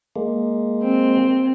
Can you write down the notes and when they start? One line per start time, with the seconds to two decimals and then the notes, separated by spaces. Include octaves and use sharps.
0.16 G#3 A#3
0.82 C4